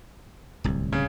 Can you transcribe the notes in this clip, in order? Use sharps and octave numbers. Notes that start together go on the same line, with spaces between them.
D1 C2
C#3